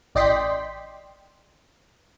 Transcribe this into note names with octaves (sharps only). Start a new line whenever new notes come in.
A1 D5 D#5 G5 C6 B6